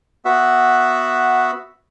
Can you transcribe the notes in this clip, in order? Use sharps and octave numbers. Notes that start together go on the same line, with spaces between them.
B3 F#4 E5